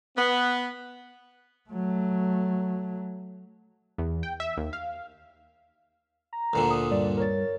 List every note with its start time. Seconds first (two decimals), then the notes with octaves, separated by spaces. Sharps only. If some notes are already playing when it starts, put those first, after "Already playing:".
0.17 B3
1.70 F#3 A3
3.98 E2
4.23 G5
4.40 E5
4.57 D#2
4.73 F5
6.33 A#5
6.53 D2 A#2 D3
6.70 D#6
6.91 G2 D5
7.17 A#4 C#5 A6